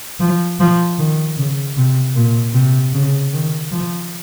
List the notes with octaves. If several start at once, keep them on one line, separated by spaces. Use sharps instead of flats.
F3
F3
D#3
C#3
C3
A#2
C3
C#3
D#3
F3